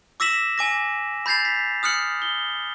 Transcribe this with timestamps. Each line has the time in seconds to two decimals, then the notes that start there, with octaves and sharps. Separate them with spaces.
0.20 D6 E6 A#6 B6 E7 F#7
0.58 G#5 D6 A#6
1.26 B5 G6 A6 C7 F7
1.45 B6
1.83 D#6 F6 F#6 C#7 F#7
2.22 G7